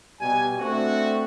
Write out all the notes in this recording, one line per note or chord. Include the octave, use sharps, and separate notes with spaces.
B2 G3 G4 G#5
A3 C4 D4 F#4